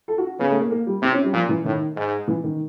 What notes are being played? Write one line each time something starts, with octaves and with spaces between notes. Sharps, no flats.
A4
F#4
C#3 B3
A3
A#3
A#3
G3
C3 C4
C#4
G3
A#2 F3
E3
A2 D#3
G#2
E3
D#3